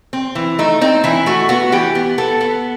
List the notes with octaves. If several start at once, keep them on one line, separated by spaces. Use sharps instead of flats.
C4
E3
A3 D#4
C4 D#4
E3 E4
A3 F#4
B3 F#4
E3 G4
B3
B3 A4
B3